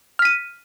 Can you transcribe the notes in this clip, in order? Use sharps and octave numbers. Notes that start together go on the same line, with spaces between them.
F6 B6 D#7